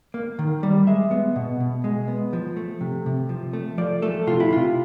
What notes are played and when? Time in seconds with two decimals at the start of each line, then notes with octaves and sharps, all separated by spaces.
0.14 A#3
0.39 D#3
0.63 G3
0.87 G#3 E5
1.11 B3
1.36 B2
1.60 B2
1.84 G#3
2.08 B3
2.33 F3
2.57 A3
2.81 C3
3.06 C3
3.29 F3
3.53 A3
3.78 F3 D5
4.02 A3 A4
4.27 C3 F4
4.40 E4
4.50 C3 F4